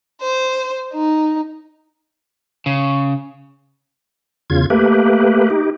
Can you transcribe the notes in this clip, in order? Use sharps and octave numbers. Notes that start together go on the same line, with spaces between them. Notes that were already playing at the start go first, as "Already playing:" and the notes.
C5
D#4
C#3
E2 C#3 F4 G#6
A3 A#3 G4 B4
D#4 G4